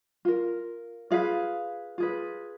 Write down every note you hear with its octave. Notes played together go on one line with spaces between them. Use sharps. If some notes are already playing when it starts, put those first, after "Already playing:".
F4 A#4
F4 G#4 B4 F5
F4 G#4 B4